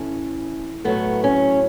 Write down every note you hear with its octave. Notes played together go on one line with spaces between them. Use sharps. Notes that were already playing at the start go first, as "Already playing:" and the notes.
Already playing: A2 E3 A3 C#4
A2 F#3 A3 B3
C#4